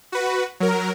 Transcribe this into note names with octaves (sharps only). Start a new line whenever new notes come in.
F#4 B4
F#3 A#4